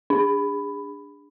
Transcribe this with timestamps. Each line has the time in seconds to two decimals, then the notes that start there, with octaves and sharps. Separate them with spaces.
0.10 D4